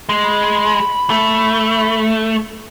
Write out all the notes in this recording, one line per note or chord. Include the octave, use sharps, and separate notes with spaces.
G#3
B5
A3